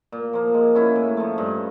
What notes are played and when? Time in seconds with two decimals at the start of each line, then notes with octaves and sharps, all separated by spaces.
0.12 A#2
0.33 F3 A#3
0.54 G#3
0.75 C#4 E4
0.96 A2
1.17 F3 A3
1.38 G2